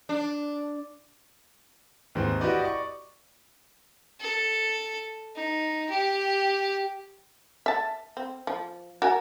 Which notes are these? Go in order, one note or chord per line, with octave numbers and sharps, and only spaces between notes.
D4
D#2 G#2 E3 C4
E4 F#4 G4 B4 D5 D#5
D5 D#5 C#6
A4
D#4
G4
E5 A5
C4
F3
F#4 A#4 G#5